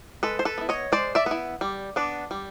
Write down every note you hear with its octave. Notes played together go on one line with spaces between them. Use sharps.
G#3 A4 B4
C5
A4 B4
B3 E4
C#5 D#5
G#3 C5 D5
D5 E5
B3 E4
G3
B3 D4
G3